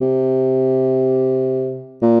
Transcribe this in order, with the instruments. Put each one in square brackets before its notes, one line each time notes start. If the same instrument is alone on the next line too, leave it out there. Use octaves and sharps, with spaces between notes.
[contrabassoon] C3
A#2